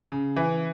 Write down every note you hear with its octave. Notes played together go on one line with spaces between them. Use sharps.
C#3
E3